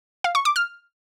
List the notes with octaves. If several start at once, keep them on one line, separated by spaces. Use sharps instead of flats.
F5
C#6
D6
F6